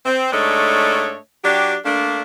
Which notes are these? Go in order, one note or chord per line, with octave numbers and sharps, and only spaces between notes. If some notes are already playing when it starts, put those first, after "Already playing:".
C4
G#2 A3 D4 C#5 D#5
F#3 D4 G4
A3 A#3 D4